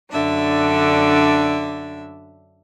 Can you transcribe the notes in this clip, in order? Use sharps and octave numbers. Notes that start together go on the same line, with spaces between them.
F#2 D3 D4 E5